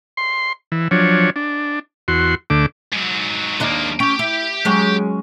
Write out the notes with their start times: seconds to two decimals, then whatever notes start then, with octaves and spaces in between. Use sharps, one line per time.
0.17 C6
0.72 E3
0.91 F3 F#3 D4 C#5
1.36 D4
2.08 E2 F#4 C6
2.50 D2 D3 A3 D6
2.92 G#2 F#3
3.60 D#2 G#3 A#3 D4 D#5
4.00 C#4 G4 G5
4.19 E4
4.65 F#3 G#3 C#4